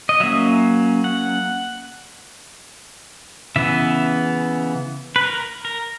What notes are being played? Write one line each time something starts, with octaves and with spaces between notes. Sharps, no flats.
D#5
F#3 A#3 C#4 E5
F#5
C#3 E3 B3 E5
B4
A#4
A#4